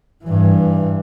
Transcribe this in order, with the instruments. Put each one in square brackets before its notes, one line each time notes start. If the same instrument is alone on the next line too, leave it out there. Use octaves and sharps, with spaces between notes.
[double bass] G2 E3